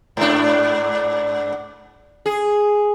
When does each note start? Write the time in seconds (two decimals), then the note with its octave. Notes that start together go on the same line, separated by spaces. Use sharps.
0.17 G#2 D4
2.26 G#4